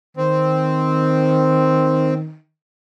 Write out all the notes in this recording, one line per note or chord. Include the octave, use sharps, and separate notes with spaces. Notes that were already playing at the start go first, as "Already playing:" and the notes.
D#3 C4